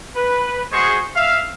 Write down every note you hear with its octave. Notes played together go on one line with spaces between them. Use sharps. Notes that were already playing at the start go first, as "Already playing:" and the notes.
B4
G#3 F#4 G#4 C5 C#6
E5 F5